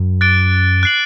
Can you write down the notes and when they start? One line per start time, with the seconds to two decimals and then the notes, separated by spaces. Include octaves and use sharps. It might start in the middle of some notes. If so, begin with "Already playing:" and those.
Already playing: F#2
0.21 D6 F#6 A6 D7 G7
0.83 F#6 C7 F#7